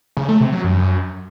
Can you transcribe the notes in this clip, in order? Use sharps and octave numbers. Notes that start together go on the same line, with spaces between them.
C#3
A3
C3
F#3
F#2